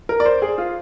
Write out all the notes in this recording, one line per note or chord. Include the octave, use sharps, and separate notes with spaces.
A#4
D5
C5
G#4
F4